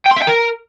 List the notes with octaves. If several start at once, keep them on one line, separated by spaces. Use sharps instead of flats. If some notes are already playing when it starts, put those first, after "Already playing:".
G5
C6
E5
G5
A#4